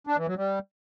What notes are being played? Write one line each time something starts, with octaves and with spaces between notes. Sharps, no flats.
D4
E3
F#3
G3